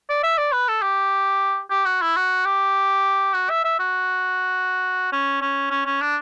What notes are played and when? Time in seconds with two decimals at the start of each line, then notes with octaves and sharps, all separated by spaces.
0.09 D5
0.23 E5
0.38 D5
0.52 B4
0.68 A4
0.82 G4
1.71 G4
1.86 F#4
2.02 E4
2.16 F#4
2.45 G4
3.34 F#4
3.50 E5
3.64 E5
3.79 F#4
5.12 C#4
5.42 C#4
5.71 C#4
5.86 C#4
6.01 D4